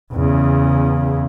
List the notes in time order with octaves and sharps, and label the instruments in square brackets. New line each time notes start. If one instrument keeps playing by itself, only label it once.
[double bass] E2 C#3